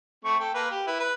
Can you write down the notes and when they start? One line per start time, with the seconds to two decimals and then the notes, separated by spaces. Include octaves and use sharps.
0.25 A3 C4 C#6
0.40 A4 G5
0.54 A#3 B4
0.71 G4
0.87 E4 B4
1.00 B4